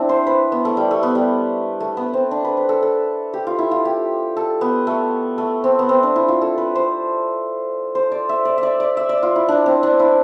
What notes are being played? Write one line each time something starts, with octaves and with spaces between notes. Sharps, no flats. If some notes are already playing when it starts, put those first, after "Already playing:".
Already playing: C4 D4 E4
C5
B4
B3
A3
G3
A3
B3
G3
A3
B3
C4
D4
B4
B4
A4
A4
G4
F4
E4
F4
G4
A4
B3
A3
A3
C4
B3
C4
D4
E4
F4
A4
B4
C5
C5
D5
E5
D5
E5
D5
D5
E5
D5
F4
E4
D4
C4
D4
E4